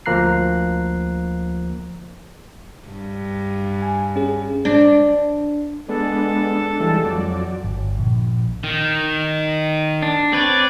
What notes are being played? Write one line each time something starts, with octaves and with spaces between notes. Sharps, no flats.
D2 F3 A#3 A#5 F#6 C7
G2
G#5
C#4 G#4
D4
G#3 B3 D4 A4
D4
E3 G3 G#3
F2 F#3 D5
G1
A#1
D#3
D4
C4 B4 C#5 D5